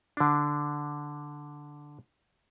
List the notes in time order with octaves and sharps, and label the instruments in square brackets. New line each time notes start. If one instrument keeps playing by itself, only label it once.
[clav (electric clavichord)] D3 D4